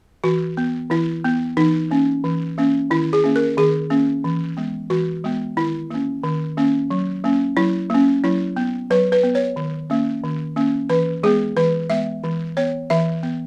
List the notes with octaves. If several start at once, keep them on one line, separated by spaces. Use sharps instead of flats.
E3 F#4
B3
E3 E4
B3
E3 D#4
A#3 C#4
E3
A#3 C#4
D#3 E4
G#4
A#3 C#4
A#4
D#3 G#4
A#3 C#4
E3
G#3 B3
E3 F#4
G#3 B3
D#3 E4
A#3 C#4
D#3
A#3 C#4
F#3
A#3 C#4
F#3 E4
A#3 C#4
F#3 E4
B3
F#3 B4
B4
B3
C#5
D#3
A#3 C#4
D#3
A#3 C#4
E3 B4
G#3 B3 G#4
E3 B4
G#3 B3 E5
E3
B3 C#5
E3 E5
B3